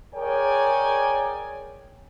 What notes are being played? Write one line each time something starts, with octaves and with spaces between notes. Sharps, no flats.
G#4 A#4 C#5 D5 G5 G#5